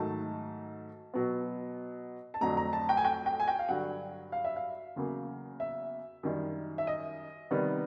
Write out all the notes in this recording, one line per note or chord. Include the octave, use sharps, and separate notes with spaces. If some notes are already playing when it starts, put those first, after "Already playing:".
Already playing: G#2 D#3 F#3 A3 A5
B2 F#3 B3
A5
F2 D3 F#3 A3 A#5
A#5
A5
G5
G#5
G5
G5
G#5
G5
F5
G2 D3 F#3 F#5
F5
E5
F5
E2 C#3 F#3 A#3
E5
F#2 D#3 G3
E5
D#5
C3 D#3 G3 B3